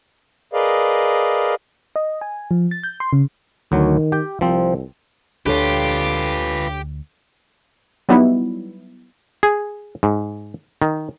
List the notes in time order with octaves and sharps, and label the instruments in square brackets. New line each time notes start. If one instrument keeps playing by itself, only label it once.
[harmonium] G#4 A#4 B4 D5 D#5 F5
[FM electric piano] D#5
G#5
F3
A6
G6
C6
C#3
[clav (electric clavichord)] D2 F#3 [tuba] D#3
[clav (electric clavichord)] G4 G5
[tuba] C2 [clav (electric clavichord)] F3 C4
[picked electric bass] D2 [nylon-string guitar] D4 A4 C#5 [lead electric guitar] F4 B4 [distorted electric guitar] G4
[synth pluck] F#3 G3 B3 D#4 E4
[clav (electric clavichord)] G#4
G#2
D#3